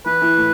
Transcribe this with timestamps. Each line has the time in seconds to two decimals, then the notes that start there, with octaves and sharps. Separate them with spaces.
0.06 E3 E4 B4
0.22 E3 E4
0.37 A2 A3